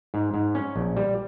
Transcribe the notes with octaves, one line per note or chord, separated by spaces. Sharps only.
G#2
G#2
C#4
A#1
G3